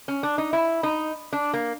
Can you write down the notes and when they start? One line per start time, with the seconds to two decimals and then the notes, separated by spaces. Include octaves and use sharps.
0.08 C#4
0.23 D4
0.38 D#4
0.53 E4
0.83 D#4
1.33 D4
1.53 A#3